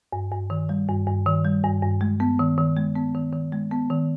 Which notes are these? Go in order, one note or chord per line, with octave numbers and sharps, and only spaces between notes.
G2
G2
D#3
G3
G2
G2
D#3
G3
G2
G2
G#3
B3
D#3
D#3
G#3
B3
D#3
D#3
G#3
B3
D#3